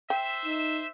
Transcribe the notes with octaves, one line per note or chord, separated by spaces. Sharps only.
C5 E5 G5
D#4